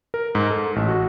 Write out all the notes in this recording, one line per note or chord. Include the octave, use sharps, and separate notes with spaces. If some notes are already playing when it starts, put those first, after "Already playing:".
A#4
G#2
A4
A1
F#4